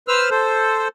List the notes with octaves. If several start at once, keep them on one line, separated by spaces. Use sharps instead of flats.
B4 C5 E6 F6
A4 C5